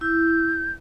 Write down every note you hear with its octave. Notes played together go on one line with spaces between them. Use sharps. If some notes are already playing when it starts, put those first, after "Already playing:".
E4 G6